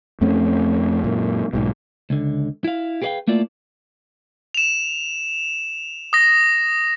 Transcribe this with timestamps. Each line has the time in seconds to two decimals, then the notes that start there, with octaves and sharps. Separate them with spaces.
0.21 F2 A3 C4 C#4
1.04 F#2 A#2
1.53 B1 G#2 B2
2.10 C#2 D3
2.64 E4 F5
3.02 G4 G#4 B4 D5 F5 G5
3.28 A3 A#3 E4 F4 D5
4.55 E7 F7
6.13 D#6 A#6